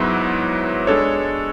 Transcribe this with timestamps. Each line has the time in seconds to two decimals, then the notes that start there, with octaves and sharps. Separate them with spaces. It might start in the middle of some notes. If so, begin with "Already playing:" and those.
Already playing: G#2 F#3 B3 E4 B4
0.87 G#3 D4 A4 C#5